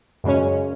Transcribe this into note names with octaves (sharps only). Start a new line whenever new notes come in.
F#2 C#3 G#3 C#4